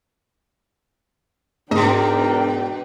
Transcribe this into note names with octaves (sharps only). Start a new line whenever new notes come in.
G#2 B2 D4 A#4 D#5 G5